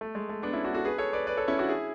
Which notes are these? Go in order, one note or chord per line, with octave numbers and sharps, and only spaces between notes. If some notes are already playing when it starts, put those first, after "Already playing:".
A3
G#3
A3
B3 D4
C#4 E4
D4 F#4
F#4 A4
G#4 B4
A4 C#5
B4 D5
B4 D5
A4 C#5
C#4 E4
D4 F#4
E4 G#4